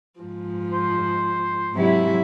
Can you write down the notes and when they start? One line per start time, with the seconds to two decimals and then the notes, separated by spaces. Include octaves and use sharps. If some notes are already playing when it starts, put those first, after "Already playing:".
0.20 G#2 F3
0.72 C5
1.75 G#2 C3 F#3 E4